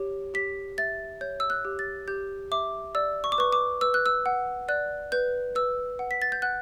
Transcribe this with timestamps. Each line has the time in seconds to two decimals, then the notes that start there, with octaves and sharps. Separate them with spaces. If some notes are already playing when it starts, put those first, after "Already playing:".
Already playing: G4 C#5
0.34 G4 B6
0.78 E5 A6
1.21 C#5 G6
1.40 E6
1.50 F#6
1.65 G4
1.79 A6
2.08 G4 G6
2.51 E5 D6
2.95 D5 E6
3.24 C#6
3.32 D6
3.38 B4 C#6
3.53 D6
3.81 B4 E6
3.94 F#6
4.06 E6
4.26 F#5
4.68 D5 F#6
5.12 B4 G6
5.55 B4 E6
5.99 F#5
6.11 B6
6.22 A6
6.32 G6
6.42 F#5 F#6